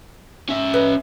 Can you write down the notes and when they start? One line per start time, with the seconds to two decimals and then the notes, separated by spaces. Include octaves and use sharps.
0.49 C#4 E5
0.74 B4 D#5